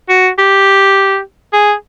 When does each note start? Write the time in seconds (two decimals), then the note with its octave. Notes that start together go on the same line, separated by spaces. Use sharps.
0.09 F#4
0.38 G4
1.53 G#4